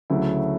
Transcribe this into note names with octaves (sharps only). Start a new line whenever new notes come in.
D2 C#3 F#3 A3 E4